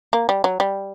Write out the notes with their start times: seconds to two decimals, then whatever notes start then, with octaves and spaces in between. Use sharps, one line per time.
0.13 A#3
0.29 G3
0.44 F#3
0.60 G3